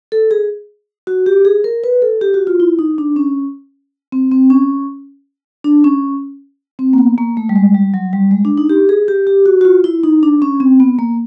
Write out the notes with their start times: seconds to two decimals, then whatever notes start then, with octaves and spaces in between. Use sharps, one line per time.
0.12 A4
0.31 G#4
1.07 F#4
1.26 G4
1.45 G#4
1.64 A#4
1.84 B4
2.02 A4
2.21 G4
2.34 F#4
2.47 F4
2.60 E4
2.79 D#4
2.98 D4
3.16 C#4
4.12 C4
4.31 C4
4.50 C#4
5.64 D4
5.84 C#4
6.79 C4
6.93 A#3
6.98 B3
7.18 A#3
7.37 A3
7.49 G3
7.56 G#3
7.75 G3
7.94 F#3
8.13 G3
8.31 G#3
8.45 D4
8.58 D#4
8.69 G4
8.89 G#4
9.08 G4
9.27 G4
9.46 F#4
9.61 F#4
9.65 F4
9.84 E4
10.04 D#4
10.23 D4
10.42 C#4
10.60 C4
10.80 B3
10.99 A#3